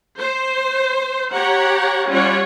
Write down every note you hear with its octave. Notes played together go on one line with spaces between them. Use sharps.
C5
G4 C#5 F#5 A#5
G3 C#4 F4 C#5 F#5